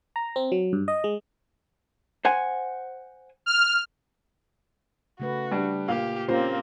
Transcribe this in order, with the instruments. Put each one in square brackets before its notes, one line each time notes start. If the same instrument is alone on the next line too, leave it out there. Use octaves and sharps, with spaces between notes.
[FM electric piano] A#5
C4
F#3
G2
D#5
G#3
[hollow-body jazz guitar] C5 F#5 G#5
[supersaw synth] F6
[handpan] C#3 A3 B4 [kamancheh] F#4
[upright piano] G3 D4
[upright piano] A#2 F5 [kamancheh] G4
[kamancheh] A#3 C4 [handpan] C#4 F4 G4 [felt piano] C5